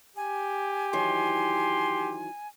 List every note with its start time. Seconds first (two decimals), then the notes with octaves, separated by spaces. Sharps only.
0.17 G4 G#5
0.93 D#3 E3 F#3 C6